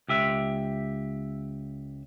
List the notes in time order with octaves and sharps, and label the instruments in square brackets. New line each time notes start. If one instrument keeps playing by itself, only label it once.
[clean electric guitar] C#2 G4 E5